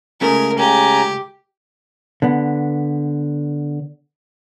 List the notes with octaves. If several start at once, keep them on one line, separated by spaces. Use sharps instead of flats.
C#2 A3 C#4 G#4 A#4
C#3 G4 G#5 A#5
D3 B3